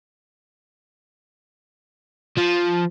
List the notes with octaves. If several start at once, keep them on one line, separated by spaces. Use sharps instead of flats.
F3